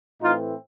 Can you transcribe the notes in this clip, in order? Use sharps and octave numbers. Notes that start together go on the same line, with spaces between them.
A2 E3 A3 C4 D#4 F4